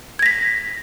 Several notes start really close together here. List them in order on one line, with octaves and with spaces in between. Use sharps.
G#6 A#6 B6